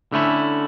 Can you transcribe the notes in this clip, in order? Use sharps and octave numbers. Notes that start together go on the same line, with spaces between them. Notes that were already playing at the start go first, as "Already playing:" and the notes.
D3 A3 C#4 E4